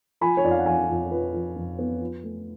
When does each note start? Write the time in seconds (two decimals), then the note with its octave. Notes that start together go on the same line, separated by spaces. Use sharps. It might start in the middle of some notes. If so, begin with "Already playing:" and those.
0.21 F3 G#5 B5
0.37 C#5
0.44 F2 D5
0.51 F5
0.59 F#5
0.66 F2 F5 G#5
0.89 F2
1.11 F3 B4
1.34 F3
1.56 F2
1.78 B3
2.01 F3
2.23 A3